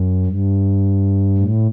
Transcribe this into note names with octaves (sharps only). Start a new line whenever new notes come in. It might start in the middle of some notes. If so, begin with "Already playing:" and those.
Already playing: F#2
G2
A2